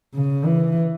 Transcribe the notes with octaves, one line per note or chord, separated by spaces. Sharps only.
C#3
E3